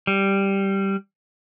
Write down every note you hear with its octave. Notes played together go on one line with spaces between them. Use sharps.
G3